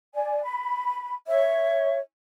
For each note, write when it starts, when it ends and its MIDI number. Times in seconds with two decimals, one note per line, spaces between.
0.15 0.40 74
0.15 0.40 80
0.43 1.14 83
1.27 1.99 73
1.27 1.95 76